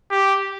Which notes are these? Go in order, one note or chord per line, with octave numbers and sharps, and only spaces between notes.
G4